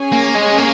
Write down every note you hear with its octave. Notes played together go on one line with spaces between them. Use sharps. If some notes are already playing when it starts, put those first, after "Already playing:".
Already playing: C#4 G#4 C#5 G#5
A#3
G#3
A#3